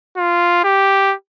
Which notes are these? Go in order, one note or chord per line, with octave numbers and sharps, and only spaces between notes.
F4
G4